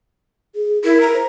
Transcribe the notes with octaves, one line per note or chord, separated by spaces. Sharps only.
G#4
E4 A#4
A#5
C5